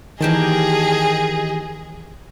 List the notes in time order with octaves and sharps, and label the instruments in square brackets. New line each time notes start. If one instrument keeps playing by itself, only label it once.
[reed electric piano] D#3 E3 [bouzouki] A#3 G4 A5 [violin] G#4 D#5